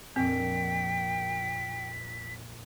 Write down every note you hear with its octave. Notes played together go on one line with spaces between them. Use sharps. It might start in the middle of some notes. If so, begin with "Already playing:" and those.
A#1 F2 A#2 C4 G5 B6